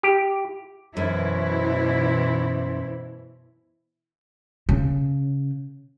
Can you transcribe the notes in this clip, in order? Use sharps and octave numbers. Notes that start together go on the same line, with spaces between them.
G4
F#2 B2 E3 E4 C5
C#3